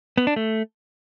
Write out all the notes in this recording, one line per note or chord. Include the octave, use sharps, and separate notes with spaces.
B3
D4
A3